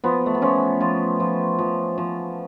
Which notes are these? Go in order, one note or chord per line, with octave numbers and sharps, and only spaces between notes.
F3 B3
A3
B3
F3 C#4
F3 F4
F3
F3
F3